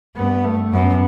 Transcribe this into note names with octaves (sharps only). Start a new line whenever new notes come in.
G2 B3
A3
F#2 B3